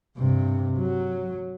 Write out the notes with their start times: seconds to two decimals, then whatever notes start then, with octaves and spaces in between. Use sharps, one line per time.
0.17 G2 C3
0.78 F#3